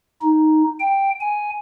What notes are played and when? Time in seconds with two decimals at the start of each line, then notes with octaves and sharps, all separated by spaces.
0.22 D#4
0.80 G5
1.20 G#5